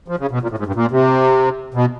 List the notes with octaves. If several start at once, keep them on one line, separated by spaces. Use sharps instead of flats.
F3
C#3
B2
A#2
A2
G#2
G2
A#2
C3
B2